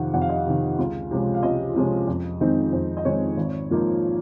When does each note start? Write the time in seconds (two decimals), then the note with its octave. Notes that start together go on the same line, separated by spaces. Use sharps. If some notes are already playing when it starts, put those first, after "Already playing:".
Already playing: F2 C3 D#3 F5 F#5
0.14 F2 F#5
0.22 F5
0.29 D#5
0.36 F5
0.46 C3 D#3
0.79 C#2
1.11 C3 F3 G#3 C#4
1.34 F5
1.43 C#2 D#5
1.75 C3 F3 G#3 C#4
2.08 F2
2.40 D#3 G#3 C4 D#4
2.72 F2 C5
2.97 D#5
3.05 D#3 G#3 C4 D#4 C#5
3.37 G#1
3.70 G#2 F3 A#3 D#4